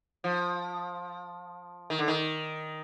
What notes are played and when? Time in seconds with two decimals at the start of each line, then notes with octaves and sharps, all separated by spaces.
0.24 F3
1.90 D#3
1.99 D3
2.08 D#3